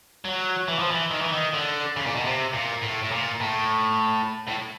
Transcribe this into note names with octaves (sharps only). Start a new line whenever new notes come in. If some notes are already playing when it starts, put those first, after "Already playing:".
F#3
E3
F3
E3
D#3
E3
D#3
D3
C#3
A#2
B2
C3
A#2
A2
A2
A#2
A2
A2